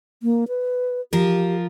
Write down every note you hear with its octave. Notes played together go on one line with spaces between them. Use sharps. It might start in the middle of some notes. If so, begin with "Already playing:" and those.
A#3
B4
F3 F4 G4 A#4